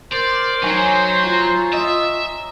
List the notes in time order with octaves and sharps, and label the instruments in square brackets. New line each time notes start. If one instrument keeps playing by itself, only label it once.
[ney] A#4 [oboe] C5 [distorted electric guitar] D5
[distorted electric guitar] F#3 [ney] D#4 [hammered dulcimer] C#5 G#5
[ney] F4 [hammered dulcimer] A#5
[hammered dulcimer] D#5 [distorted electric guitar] E5